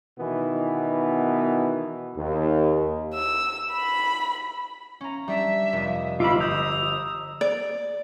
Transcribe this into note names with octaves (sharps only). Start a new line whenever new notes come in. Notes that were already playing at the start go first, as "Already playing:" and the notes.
B2 D#3 E3 B3
D#2
E6
B5
C#4 A#5
G3 D4 E5
F1 D#5
G1 F4 D#5 B5 D6 E6
A#5 D#6 E6 G6
D5